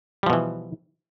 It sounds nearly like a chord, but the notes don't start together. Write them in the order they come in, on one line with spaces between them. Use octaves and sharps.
G3 F3 B2 E3